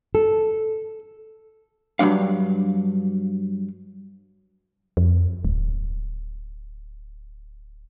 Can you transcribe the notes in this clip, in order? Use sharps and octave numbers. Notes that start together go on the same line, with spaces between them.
A4
G2 F3 F#3 D4 F5
F2
D1